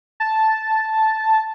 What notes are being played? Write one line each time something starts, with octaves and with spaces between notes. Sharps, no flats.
A5